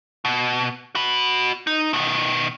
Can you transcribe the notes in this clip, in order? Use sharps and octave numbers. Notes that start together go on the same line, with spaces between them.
B2
F#4 B5
D#4
B2 D#3